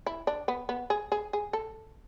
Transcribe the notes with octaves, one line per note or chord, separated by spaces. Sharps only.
E4
D4
B3
B3
G#4
G#4
G#4
A4